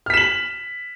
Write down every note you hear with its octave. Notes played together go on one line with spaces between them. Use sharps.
F6 B6 E7 F#7